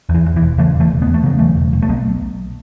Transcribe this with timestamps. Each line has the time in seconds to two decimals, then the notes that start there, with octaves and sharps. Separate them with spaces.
0.09 E2
0.15 E3
0.26 E2
0.36 E3
0.42 E1
0.58 C#3 E3 A3
0.74 E1
0.80 E3 A3
0.91 E1
1.02 E2 B3
1.14 A3
1.23 C#3 F#3
1.39 E1 E3 A3
1.56 E1
1.73 E1
1.82 A3
1.89 B1 F#3 B3